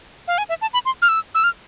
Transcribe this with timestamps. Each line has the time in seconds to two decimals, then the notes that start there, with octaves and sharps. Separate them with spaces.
0.28 F5
0.38 G#5
0.49 E5
0.62 A5
0.74 B5
0.85 C6
1.02 F6
1.09 E6
1.35 E6
1.44 F6